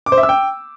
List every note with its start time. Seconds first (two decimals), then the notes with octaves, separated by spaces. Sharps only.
0.06 D6
0.12 C5
0.18 E5
0.23 E6
0.29 G5